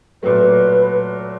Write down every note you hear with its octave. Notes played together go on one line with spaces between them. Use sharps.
A#2 F#3 A3 B4